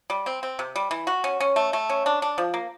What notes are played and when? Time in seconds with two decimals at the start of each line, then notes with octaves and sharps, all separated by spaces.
0.10 G3
0.26 C4
0.43 C4
0.59 C3
0.76 G3
0.91 E3
1.07 F#4
1.24 C#4
1.40 C#4
1.56 A3
1.73 A3
1.89 C#4
2.06 D4
2.22 D4
2.38 F3
2.54 A#3